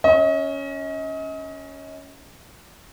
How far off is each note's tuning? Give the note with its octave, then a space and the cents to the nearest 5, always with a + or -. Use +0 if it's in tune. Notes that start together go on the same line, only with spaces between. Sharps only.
C#4 +5 D#5 +35